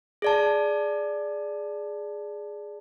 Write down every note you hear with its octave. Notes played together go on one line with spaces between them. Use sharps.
G#4 D5 A5